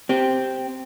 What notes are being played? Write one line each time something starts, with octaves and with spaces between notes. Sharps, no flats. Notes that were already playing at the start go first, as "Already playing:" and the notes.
C4 G4